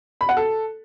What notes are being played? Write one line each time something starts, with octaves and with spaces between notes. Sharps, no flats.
B5
F#5
A4